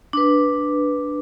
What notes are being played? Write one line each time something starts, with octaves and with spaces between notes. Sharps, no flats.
D4 B4